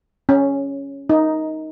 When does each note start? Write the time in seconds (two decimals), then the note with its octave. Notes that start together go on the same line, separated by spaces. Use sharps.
0.29 C#4
1.10 D#4